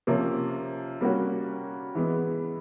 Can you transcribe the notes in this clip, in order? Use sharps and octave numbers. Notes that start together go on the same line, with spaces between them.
C3 F3 A#3 C#4
G3 A#3 C#4 F#4
E3 G#3 B3